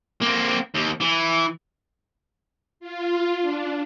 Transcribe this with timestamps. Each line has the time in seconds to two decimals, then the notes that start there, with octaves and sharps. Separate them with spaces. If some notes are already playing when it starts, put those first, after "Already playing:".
0.21 A#3 C4
0.74 D#2
1.00 E3
2.80 F4
3.42 D4